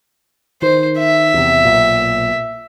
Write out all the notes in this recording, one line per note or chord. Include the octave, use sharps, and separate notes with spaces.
D#3 C5
E5
E2 C3
B1 A#2